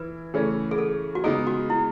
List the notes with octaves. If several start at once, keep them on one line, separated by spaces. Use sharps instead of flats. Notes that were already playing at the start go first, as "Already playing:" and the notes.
Already playing: E3 E4 B4
C#3 E3 A3 C#4
G#4
A4
F#4
C#3 G#3 B3 D#4 G#4
F#4
E4